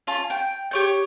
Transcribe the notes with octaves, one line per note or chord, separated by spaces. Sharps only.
C#4 F4 A5
G5
G4 C#5 G6